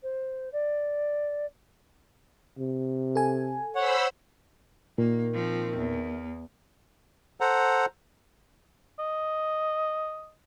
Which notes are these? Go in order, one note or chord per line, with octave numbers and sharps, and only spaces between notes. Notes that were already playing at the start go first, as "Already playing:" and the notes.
C5
D5
C3
A4 G#5
C5 C#5 F#5 B5 E6
A#2 D#3 A#3
F3 C4
E2
A4 C5 F#5 A#5
D#5